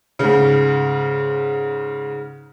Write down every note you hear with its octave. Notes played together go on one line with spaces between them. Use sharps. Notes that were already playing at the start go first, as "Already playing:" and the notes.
G#2 C#3